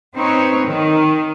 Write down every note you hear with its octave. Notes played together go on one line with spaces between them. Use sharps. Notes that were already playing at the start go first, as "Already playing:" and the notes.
C4 D#4 B4 C#5
D#3